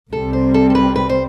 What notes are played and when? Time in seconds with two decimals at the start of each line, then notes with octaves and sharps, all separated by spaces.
0.12 C2 C3 G3 A4
0.33 C5
0.54 A4
0.70 A4
0.75 B4
0.96 B4
1.09 C5